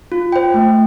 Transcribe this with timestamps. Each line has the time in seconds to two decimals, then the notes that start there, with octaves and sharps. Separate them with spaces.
0.12 F4
0.32 C5 G5
0.54 A3